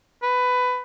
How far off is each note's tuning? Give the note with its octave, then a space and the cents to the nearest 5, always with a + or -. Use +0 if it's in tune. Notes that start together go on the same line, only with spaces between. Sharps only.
B4 +15